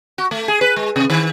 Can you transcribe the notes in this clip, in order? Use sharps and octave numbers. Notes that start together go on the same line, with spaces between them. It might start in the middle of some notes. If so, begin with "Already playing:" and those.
F#4
A3
G#4
B4
G#3
C3
D#3